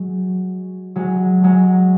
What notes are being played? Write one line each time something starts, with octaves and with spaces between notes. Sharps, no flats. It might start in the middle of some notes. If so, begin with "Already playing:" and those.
Already playing: F#3 G#3
F#3 G#3
F#3 G#3